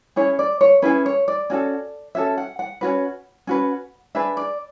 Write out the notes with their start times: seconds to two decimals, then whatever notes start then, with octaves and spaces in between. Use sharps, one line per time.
0.16 C#4 E4 G#4 C#5
0.39 D5
0.61 C#5
0.82 C#4 E4 G#4 B4
1.06 C#5
1.28 D5
1.50 C#4 F#4 A4
2.15 C#4 F#4 A4 E5
2.37 F#5
2.59 F#5
2.81 C#4 F#4 B4
3.47 C#4 F#4 B4
4.15 D4 G#4 B4 E5
4.37 D5